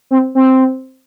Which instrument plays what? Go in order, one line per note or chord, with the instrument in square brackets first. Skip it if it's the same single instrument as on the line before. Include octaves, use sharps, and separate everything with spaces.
[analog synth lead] C4
C4